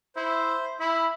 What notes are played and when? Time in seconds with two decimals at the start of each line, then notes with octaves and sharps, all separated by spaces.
0.16 E4 C5
0.80 E4 B5